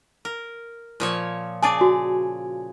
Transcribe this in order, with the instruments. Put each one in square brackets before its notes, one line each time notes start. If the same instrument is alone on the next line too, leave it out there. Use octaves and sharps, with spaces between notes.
[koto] A#4
A#2 F3 C#5
[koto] C#3 G#4 D5 [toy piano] G#5 A5
[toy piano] F#4